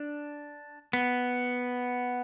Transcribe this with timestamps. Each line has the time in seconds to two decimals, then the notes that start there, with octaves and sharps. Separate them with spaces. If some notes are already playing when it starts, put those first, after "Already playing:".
Already playing: D4
0.93 B3